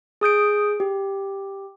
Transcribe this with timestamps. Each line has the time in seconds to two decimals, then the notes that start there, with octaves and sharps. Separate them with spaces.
0.21 G#4 D#6 G6 D7
0.80 G4